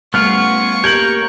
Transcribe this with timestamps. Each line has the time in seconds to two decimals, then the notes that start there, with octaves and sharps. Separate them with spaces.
0.14 G3 A3 B3 C#4 F4 C#6 F6
0.84 A#3 G4 A#4 C#5 G6 F#7